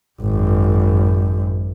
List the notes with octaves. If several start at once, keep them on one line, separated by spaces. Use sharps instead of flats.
G#1 F#2